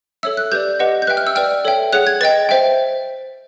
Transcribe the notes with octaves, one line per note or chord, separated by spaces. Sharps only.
A4 C#5 E5 E6
F#6
G4 B4 D5 G6
G4 B4 D#5 F#5
G6
B4 E5 G5 F#6
F6
E6
B4 D5 G5 F6
A4 C#5 E5 G5
G#4 C#5 F#5 F#6
G#6
B4 D#5 G5 A6
C5 E5 G5